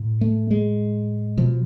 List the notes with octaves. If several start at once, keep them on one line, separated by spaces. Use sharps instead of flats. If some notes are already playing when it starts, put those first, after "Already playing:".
Already playing: A2
A3
G#3
B2 F3